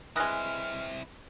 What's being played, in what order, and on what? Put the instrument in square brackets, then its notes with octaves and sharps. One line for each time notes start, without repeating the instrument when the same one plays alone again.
[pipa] E3 G#3 [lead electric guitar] C4 E4 [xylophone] D#6 F#6 A#6 [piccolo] F6